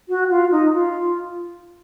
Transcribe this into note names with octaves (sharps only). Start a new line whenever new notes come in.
F#4
F4
D#4
F4